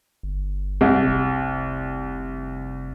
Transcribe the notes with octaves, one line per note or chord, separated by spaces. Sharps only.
G1
C2 C3
F1